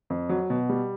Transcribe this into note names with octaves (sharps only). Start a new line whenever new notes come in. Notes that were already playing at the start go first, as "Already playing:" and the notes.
F2
F#3
B2
G3